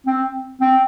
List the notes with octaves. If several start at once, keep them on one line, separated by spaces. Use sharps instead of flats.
C4
C4